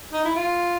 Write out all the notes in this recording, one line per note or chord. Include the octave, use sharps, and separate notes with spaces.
D#4
E4
F4